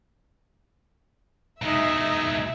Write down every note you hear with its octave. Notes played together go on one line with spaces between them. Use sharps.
B2 G#3 D#4 E5